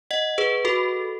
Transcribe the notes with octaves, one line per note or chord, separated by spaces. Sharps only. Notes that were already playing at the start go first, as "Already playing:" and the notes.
D#5 F#5
G#4 B4
F#4 A4